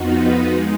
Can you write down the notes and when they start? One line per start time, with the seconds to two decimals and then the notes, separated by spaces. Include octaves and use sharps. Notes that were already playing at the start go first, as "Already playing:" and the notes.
Already playing: F2 F3 B3 D#4 F#4
0.18 B4
0.47 G#3 D#4